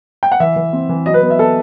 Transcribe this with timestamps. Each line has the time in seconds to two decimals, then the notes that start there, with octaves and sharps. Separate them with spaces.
0.23 G5
0.32 F#5
0.40 E3 E5
0.56 E3
0.73 C4
0.89 E3
1.06 F#3 D#5
1.14 B4
1.22 B3
1.30 E5
1.39 B3 A4